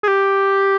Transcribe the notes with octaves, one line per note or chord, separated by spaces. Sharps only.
G#4
G4